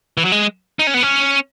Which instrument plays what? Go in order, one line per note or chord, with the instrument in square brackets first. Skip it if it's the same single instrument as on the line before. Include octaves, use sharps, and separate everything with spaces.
[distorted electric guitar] E3
F#3
G#3
D#4
C#4
B3
C#4